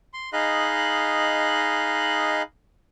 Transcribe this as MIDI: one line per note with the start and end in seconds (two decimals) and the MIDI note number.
0.14 0.30 84
0.33 2.42 63
0.33 2.42 68
0.33 2.42 75
0.33 2.42 77
0.33 2.42 83
0.33 2.42 90